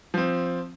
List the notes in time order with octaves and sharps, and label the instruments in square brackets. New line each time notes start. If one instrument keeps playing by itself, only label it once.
[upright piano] F3 C4